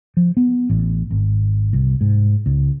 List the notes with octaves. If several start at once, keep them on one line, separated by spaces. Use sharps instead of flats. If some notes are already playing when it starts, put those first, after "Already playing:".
F3
B3
A1
G#1
C2
G#2
C#2